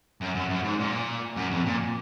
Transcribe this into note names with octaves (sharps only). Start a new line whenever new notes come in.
F#2
F#2
F#2
G#2
A#2
F#2
F2
A#2